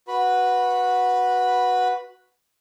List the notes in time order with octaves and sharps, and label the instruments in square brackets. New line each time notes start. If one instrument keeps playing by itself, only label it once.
[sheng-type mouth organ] F#4 B4 B5